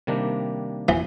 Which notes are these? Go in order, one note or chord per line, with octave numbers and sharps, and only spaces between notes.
C3 D#3 G3 A#3 D4
E3